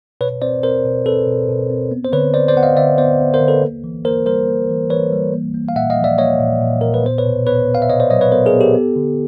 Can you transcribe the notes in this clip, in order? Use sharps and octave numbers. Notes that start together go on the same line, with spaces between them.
B2 B4 C#5
C4 C5 D5
C4 A#4 C5
B2
C4 A4 B4
B2
B2
C4
B3
C5
D3 B4 C#5
D3 C5 D5
C5 D5
B3 F#5
D#5 F5
D3 D5 E5
B3 C5 D5
B3
A#4 C5
D3
A4 B4
A#3
E3
A#3 A#4 C5
G3 A#4 C5
A#3
E3
E3 B4 C#5
G3
A#3
A#3
F5
A#2 E5 F#5
D#5 F5
F3
D5 E5
A#3 C#5 D#5
A#2
A#2
A#2 A#4
B4
B3 C5
B4 C#5
B2
B3 B4 C#5
B3
F5
E5
B2 C#5 D#5
C5 D5
F#3 C#5 D#5
B4 C#5
B3 A#4 C5
G#4 A#4
B3
G4 A4
B3
D3